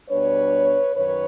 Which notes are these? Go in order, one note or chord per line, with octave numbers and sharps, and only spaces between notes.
B2 G3 B3 D4 B4 C#5
F#2 D#3 B4 C#5